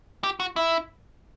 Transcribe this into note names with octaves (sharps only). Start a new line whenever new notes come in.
G4
F#4
E4